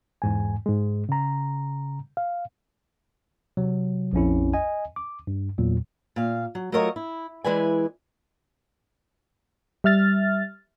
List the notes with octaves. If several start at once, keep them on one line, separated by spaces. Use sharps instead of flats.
E2 G#2 G#5
G#2 G#3
C#3 A#5
F5
C3 F#3
A#1 F2 C#4 E4
D#5 G#5
D6
G2
E2 A#2 F#3
A#2 F5
F#3
F#3 A3 F4 A#4 C#5 D#5
E4
E3 G#3 E4 B4 D5 G#5
G3 E5 F6 A6